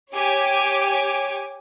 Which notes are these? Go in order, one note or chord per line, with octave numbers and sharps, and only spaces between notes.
G4 C#5 G#5 D6